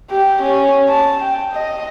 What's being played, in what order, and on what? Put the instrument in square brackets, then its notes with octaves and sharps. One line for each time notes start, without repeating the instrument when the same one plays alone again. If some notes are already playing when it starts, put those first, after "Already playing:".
[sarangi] G4
C#4
A5
G5
D#5